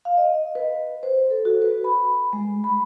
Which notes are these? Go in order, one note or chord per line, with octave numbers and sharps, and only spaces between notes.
F5
D#5
B4
C5
A4
F#4
B4
B5
G#3
B5